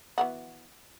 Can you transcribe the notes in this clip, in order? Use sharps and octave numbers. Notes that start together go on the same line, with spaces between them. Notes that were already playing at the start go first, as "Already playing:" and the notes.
E3 B3 F#4